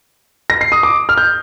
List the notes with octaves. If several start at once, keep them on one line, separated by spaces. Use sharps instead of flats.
A#6
C7
D#6
D6
F6
G6